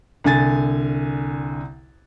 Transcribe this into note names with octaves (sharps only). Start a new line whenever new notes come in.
C2 D3 G#5 A6